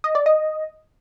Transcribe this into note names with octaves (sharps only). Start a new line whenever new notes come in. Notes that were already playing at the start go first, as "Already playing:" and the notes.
D#5
D5
D#5